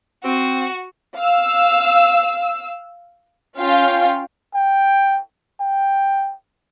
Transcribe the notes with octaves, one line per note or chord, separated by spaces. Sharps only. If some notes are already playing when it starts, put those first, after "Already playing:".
C4 F#4
F5 E6
C#4 F4 F5 G5
G5
G5